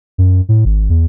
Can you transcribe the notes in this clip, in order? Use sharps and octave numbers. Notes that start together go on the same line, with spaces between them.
F#2
A2
G#1
E2